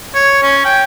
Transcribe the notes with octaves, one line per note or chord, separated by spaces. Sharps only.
C#5
C#4
G5